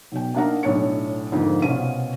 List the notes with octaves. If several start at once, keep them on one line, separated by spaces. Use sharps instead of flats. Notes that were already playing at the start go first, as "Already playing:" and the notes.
B1 B2 G5
A#3 D4 D#4 F5 F#5 A#5
B1 A2 D4 C#5 C#7
F2 G#2 D3 A#3
C2 B2 C#4 C5 F5 D#7